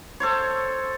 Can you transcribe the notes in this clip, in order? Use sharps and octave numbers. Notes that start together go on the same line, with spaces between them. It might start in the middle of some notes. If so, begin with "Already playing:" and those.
A4 C5 C#5